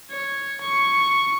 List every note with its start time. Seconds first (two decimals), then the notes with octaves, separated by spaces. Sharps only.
0.11 C#5
0.61 C#6